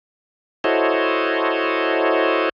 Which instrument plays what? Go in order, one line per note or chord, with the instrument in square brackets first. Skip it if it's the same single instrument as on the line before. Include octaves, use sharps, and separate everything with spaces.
[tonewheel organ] E4 F#4 A4 C5 C#5 D#5